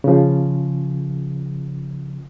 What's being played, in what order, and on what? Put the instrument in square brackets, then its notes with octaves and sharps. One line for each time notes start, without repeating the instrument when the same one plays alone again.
[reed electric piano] C#3 F3